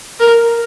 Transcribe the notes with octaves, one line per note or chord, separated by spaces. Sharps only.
A#4